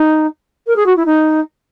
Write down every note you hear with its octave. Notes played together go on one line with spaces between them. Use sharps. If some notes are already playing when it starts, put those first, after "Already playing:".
Already playing: D#4
A#4
G#4
F#4
E4
D#4